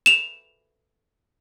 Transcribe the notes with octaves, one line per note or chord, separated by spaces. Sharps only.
E7 F7